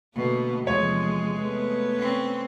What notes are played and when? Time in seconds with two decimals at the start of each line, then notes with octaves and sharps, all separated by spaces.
0.15 B2 D3 A3 A#3
0.67 E2 C3 F3 G#3 C#5
1.38 A3 B3 B4
1.97 C4 C#4